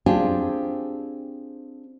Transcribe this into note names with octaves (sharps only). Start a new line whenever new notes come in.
C4 D4 F4 G4 G#4